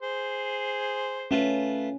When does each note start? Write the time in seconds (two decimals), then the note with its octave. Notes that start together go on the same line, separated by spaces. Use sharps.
0.03 G#4 C5
1.31 A3 C#4 F4 B4